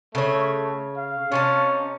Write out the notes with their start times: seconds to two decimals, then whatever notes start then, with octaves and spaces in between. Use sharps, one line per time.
0.15 C#3 A3 C#5
0.97 F5
1.32 C3 C#4 D#4 A5